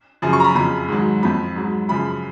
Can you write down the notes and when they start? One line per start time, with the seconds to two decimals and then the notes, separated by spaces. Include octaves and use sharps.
0.22 F#2 C#3 F3
0.33 C#6
0.40 A#5
0.44 B5
0.55 F2 C#3 F3 B5
0.88 G#2 D#3 F#3
1.22 F2 F3 B5
1.56 G#2 F#3
1.88 F#2 C#3 F3 B5